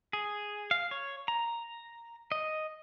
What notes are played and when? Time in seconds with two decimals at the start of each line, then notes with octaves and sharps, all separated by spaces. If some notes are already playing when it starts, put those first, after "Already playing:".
0.13 G#4
0.71 F5
0.91 C#5
1.28 A#5
2.32 D#5